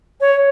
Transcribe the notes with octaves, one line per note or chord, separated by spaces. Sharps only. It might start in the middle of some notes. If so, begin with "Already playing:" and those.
C#5